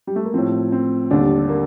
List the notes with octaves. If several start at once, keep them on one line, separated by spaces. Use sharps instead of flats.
G3
A3
A#3
A2 F3 C4
C4
D#2 D3 G3 D4
A#3